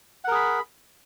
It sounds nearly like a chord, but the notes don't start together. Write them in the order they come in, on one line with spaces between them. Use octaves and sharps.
F#5 A#4 G#4 B5